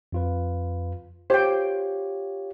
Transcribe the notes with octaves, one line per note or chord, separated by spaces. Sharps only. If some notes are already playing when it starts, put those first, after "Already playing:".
F2 F4 B4
F4 G4 C5 C#5 G5